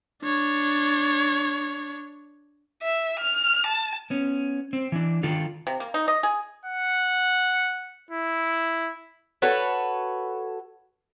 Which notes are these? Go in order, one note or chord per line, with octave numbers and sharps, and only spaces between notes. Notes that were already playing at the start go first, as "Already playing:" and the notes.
D4 C#5
E5
F6
A5
B3 C#4
C4
E3 D4
D#3 D4 F4 A4
C3
A#3
D#4
D#5
G#4
F#5
E4
F#4 A4 B4 C#5